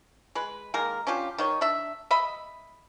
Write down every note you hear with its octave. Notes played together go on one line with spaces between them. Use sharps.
G#3 B4
D#3 G#3 A#3 A#4
C#4 D4 F4 G4
D#3 D#4 C#5
D4 E5
D#5 E5 B5